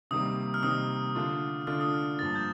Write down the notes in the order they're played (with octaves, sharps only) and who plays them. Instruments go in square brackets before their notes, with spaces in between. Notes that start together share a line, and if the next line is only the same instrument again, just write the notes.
[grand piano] C3 D#3 G3 A#3 [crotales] D#6
[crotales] F6
[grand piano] C3 D#3 G3 A#3 [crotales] D#6
[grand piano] D3 A3 D4 F4
[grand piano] D3 A3 D4 F4 [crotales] F6
[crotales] D#6
F6
[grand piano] G2 F3 A#3 [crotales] A6
[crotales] G6